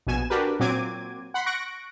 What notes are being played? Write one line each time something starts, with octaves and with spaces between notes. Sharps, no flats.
A#1 B2 G#5 E7
D4 F#4 G4 A#4 B4
A#2 F#3 C4 D6 G#6 D#7
F#5 B5 C6
C#6 F#6 A#6 D7